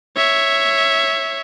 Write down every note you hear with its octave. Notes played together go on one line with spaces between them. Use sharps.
C#5 E5